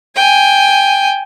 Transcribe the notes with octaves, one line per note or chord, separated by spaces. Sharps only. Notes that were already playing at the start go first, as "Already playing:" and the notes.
G5 G#5